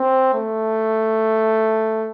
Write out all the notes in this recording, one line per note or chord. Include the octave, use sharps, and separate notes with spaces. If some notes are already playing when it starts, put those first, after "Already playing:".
Already playing: C4
A3